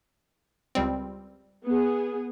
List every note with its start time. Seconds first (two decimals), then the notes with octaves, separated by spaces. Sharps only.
0.75 C#2 G3 C4
1.65 B3 G#4